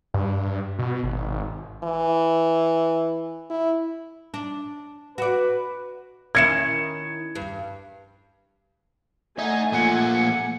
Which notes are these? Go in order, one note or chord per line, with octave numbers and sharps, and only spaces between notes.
G2
B2
G#1
E3
E4
D4
F#4 B4 D5
D#3 C#4 E4 G#6 C#7 E7
G2
A3 D#4 E5 F#5 G#5
A#2 F3 A#3 F#5